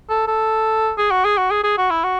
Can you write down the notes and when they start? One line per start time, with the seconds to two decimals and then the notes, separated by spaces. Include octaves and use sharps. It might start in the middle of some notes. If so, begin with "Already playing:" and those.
0.10 A4
0.28 A4
0.98 G#4
1.11 F#4
1.25 G#4
1.38 F#4
1.51 G#4
1.64 G#4
1.78 F#4
1.91 E4
2.04 F#4